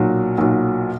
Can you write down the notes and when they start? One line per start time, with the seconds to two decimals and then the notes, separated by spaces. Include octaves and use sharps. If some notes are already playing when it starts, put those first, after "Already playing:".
Already playing: B1 A#2 F#3
0.38 B1 A#2 F#3